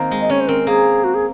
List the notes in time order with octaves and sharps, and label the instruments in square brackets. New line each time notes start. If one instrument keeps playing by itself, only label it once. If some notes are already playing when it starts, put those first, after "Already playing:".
Already playing: [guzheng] D#3 A#3 C4
G#3
[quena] D#5
[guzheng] C#4 [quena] C#5
[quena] C5
[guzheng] C4 [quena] A#4
[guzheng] A#3 [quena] G#4
[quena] F#4
G#4